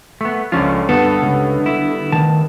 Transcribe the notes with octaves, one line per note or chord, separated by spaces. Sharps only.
A3 B3
C#2 D3 F3 C#4 F4
G2 D3 B3 A4
C#2
E4
D2 D#3 A5